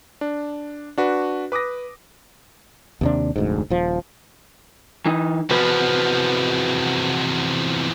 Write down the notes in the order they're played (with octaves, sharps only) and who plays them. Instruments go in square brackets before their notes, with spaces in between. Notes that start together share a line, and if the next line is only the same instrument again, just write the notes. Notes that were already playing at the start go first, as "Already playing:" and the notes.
[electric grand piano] D4
D4 F#4 B4
B4 D6 D#6 A#6
[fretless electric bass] D#2 C3 D4
F1 D2 G#2
D#1 F3
[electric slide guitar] E3 D#4
[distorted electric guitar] E2 F3 [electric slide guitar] C3 F#4 B4